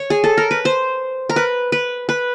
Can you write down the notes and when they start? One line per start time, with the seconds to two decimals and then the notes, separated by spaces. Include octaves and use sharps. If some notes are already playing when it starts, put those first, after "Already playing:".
Already playing: C#5
0.10 G#4
0.24 A4
0.37 A#4
0.51 B4
0.65 C5
1.29 A#4
1.36 B4
1.72 B4
2.09 B4